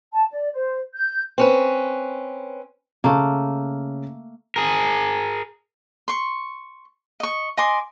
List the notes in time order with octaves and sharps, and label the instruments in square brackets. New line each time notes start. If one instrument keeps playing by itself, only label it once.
[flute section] A5
D5
C5
G6
[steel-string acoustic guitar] C4 C#4 B4
[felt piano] C#3 [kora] A3 A#3
[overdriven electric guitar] G#4 A#4
[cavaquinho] C6 C#6
D#5 C#6
D#5 G#5 C6 D6